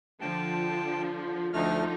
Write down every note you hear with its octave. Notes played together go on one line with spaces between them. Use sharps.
D3 F3 G5 A5
D2 D3 F3 A3 D#4 F6